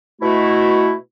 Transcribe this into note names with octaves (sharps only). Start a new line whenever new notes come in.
B2 A3 E4 F#4